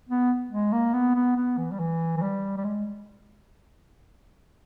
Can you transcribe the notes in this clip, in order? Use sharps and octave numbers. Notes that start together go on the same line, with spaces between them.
B3
G#3
A#3
B3
B3
B3
E3
G3
E3
E3
G3
G3
G#3